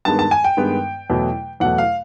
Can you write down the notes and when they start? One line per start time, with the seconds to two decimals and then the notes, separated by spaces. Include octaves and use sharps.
0.05 G2 D#3 G#3 B3 A5
0.19 A5
0.31 G#5
0.44 G5
0.57 G2 D#3 G#3 B3
1.10 E2 B2 F#3 A3
1.60 E2 B2 F#3 A3 F#5
1.78 F5